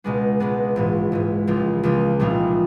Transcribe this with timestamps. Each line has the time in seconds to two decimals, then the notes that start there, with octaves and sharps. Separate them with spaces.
0.04 C#2 B2 G#3 B3 D4
0.40 C#2 B2 G#3 B3 D4
0.76 A#1 G#2 E3
1.12 A#1 G#2 E3
1.47 C#2 C#3 F3 A#3
1.83 C#2 C#3 F3 A#3
2.20 C2 A#2 F3 A#3 D#4